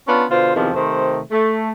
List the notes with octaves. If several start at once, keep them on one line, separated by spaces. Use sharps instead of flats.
B3 C#4 D4 F4
B2 D3 F4 C5
E2 C3 D#3 F3
C3 D#3 A3 C5
A3